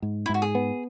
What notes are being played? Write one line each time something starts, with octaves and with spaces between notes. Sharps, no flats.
G#2
E4
G#2 F#4
G#4
B3